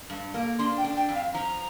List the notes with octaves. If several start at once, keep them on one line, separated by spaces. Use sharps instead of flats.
G2
A#3
D4 C6
G5
D4
G5
F2
F5
F3 A#5